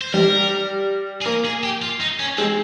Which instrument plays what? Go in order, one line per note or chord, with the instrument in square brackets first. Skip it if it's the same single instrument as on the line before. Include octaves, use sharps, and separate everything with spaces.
[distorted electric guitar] C5
[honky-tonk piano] G3 [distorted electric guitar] A#4
[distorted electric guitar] G#4
[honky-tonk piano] A#3 [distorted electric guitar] A#4
[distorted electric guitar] G#4
G4
F4
D#4
C#4
[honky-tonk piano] G#3 [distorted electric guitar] C4